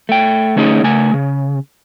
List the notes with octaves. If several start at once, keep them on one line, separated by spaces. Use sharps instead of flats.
A3 G5
D3 A3 C#4 D#4 G#4 D#5
C#3 A3 G#5
C#3